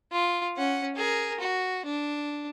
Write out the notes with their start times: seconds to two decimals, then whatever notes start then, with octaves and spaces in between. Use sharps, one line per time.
0.12 F4
0.57 C#4 F#5
0.96 G#4 A#4
1.40 F#4
1.86 D4